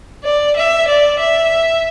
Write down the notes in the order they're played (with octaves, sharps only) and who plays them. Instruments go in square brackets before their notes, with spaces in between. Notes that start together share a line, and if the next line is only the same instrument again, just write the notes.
[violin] D5
E5
D5
E5